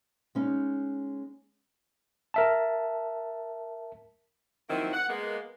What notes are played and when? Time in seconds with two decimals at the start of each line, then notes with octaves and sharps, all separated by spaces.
0.35 G#3 C#4 D#4
2.34 A#4 E5 A5
4.69 D#3 F3 F#3 A#3 C4 E4
4.93 F#5
5.09 G#3 A#3 B3